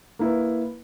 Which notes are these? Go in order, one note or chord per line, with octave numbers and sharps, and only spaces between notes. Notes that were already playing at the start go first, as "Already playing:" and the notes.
A#3 E4 B4